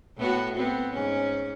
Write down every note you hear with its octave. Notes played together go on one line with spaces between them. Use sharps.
A2 B3 F#4
B3 C4
G#2 C#4